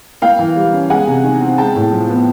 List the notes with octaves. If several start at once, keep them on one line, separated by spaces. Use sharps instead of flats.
A#3 F5 G5
E3
G3
C#4
G#3 F#5 G#5
C3
D#3
C4
G#3 G5 A5
A2
F3
B3